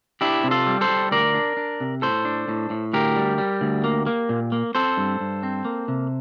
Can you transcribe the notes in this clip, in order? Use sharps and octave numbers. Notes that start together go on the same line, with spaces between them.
D4 E4 G4
C3
F4 A4
G3
A4 C5
G3
D2 A#4 D5
D4
D4
C3
A2 A4 C5
D4
A2
A2
D2 G4 A#4
G3
G3
D2
A#3
A#3
A#2
A#3
C4 A4 C5
G2
G2
C4
A#3
C3